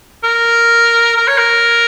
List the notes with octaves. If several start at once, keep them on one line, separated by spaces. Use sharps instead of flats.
A#4
A#4
C#5
A#4